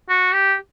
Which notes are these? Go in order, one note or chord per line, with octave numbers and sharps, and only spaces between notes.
F#4
G4